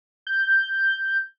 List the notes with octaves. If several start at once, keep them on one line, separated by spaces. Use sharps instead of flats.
G6